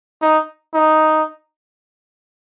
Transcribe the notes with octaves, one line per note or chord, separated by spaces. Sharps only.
D#4
D#4